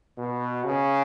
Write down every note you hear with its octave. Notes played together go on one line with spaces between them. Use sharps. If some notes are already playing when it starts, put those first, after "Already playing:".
B2
C#3